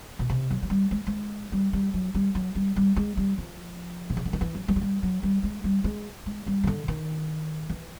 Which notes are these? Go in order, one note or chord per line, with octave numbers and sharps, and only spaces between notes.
B2
C3
F#3
F#3
G3
G#3
G#3
G3
G3
F#3
G3
F#3
G3
G3
G#3
G3
F3
C3
C#3
D3
D#3
E3
F#3
G3
F#3
G3
F#3
G3
G#3
G3
G#3
G#3
G3
C#3
D3
D#3
E3